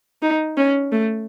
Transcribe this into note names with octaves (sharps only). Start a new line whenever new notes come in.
D#4
C#4
A3